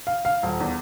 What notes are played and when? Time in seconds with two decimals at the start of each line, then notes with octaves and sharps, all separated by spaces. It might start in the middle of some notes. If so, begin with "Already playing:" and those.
0.07 F5
0.25 F5
0.43 D#1
0.60 E2